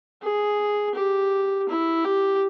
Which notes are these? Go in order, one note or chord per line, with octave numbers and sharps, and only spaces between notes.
G#4
G4
E4
G4